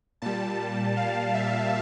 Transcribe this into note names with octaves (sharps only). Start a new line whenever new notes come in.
A#2 G3 A5
F5
E5